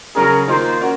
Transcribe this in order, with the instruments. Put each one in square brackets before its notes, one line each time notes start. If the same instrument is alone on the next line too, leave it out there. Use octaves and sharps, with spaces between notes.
[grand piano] C#3 F#3 C#4 G#4 [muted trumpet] A#4
[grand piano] D#3 A#3 F4 A#4 [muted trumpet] C5
[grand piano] C#4 F#4 A#4